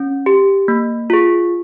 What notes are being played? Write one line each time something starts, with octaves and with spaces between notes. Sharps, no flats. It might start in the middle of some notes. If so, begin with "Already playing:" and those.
Already playing: C#4
G4
A#3
F4 G#4